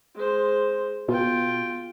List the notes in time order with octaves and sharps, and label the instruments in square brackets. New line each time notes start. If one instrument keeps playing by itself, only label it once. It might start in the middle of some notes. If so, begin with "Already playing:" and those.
[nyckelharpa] G#3 C5
[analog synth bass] B2 [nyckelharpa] F4 G5